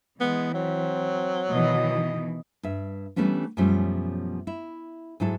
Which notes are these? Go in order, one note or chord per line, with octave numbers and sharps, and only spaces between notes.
E3 G#3 B3
F#3 C4
B2 D#3 E3 D#5
G2 E5
E3 G3 A3 B3 C#4 D4
F#2 B2 F3 G3 A3 C#4
E4
G#2 F#3 E4 A4